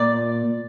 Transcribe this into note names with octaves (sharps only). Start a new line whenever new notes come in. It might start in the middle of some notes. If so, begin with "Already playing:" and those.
Already playing: A#2 D5